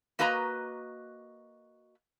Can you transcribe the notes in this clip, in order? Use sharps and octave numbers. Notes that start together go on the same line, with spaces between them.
A#3 F#4 B4 D#5 A#5